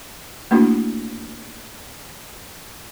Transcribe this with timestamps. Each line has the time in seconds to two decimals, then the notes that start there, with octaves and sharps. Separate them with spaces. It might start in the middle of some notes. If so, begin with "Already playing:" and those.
0.51 A3 A#3 D4 E4 F#4